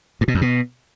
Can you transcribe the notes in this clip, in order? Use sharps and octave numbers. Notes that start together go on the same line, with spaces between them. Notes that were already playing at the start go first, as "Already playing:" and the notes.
G2
B2
F2
B2